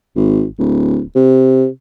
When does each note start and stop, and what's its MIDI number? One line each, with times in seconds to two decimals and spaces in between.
0.16 0.45 32
0.58 1.01 26
1.15 1.66 48